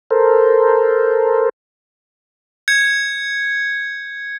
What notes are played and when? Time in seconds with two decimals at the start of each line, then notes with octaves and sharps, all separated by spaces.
0.11 A4 A#4 C5
2.68 G6 G#6 C#7